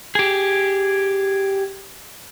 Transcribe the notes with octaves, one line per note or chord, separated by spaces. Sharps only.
G4 G#4